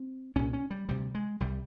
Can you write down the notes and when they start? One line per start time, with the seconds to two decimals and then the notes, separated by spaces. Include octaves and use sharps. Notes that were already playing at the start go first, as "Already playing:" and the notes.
Already playing: C4
0.36 C2 A#2 C#4
0.53 C#4
0.71 G3
0.89 D2 C3 G3
1.15 G#3
1.40 C2 C3 G3